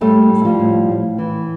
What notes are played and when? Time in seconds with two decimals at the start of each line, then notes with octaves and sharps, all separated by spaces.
0.01 A2 G3 A3
0.30 A2
0.45 F3 G3
0.60 A2
0.89 A2
1.18 E3